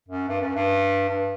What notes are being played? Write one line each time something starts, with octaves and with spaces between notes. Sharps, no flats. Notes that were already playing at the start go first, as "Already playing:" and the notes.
F#2
G2
F#2
G2
G2